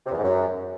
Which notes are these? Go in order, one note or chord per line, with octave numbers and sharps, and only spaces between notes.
C3
E2
G#2
F#2